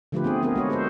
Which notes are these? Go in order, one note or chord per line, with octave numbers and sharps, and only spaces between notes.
D3 F3 A3 F4 G4 B4
B3 C4 G#4
B3 C4 G#4 A#4
G#3 F#4 C#5
G#4 A4 B4 C5